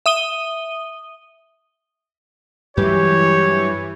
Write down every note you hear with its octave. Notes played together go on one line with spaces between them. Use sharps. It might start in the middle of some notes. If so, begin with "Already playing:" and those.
E5 D#6 D#7 G7
G2 E3 F#3 G#3 G4 C#5